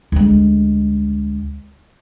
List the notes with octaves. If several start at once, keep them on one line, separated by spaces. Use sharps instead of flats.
D2 G#3